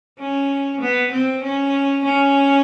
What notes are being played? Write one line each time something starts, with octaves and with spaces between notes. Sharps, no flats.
C#4
B3
C4
C#4
C#4